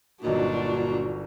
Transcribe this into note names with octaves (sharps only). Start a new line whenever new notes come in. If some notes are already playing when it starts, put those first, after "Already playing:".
G1 A#2 F#3 D4 D#4 F#4